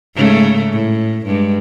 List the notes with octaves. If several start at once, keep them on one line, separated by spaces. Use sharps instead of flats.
G#2 C#3 A3
A2
G2 G#3